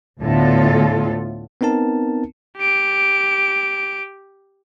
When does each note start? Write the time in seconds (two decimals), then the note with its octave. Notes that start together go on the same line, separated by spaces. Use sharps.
0.21 D2 A2 D3 B3 F4 A4
1.61 B3 C4 D#4 A#4 A5
2.57 G4 D7